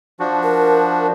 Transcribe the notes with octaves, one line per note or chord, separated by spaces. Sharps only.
F3 D4 F#4
A#4